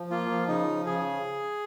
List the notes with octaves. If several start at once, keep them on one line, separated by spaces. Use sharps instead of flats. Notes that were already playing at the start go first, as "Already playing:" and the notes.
Already playing: F3
A#3 F4
F3
C#3 D#4
F3
C#3 G#4